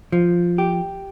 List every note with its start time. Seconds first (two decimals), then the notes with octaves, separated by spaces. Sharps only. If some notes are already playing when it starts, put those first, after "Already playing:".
0.12 F3
0.58 G4